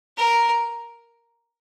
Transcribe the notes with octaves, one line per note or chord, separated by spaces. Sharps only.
A#4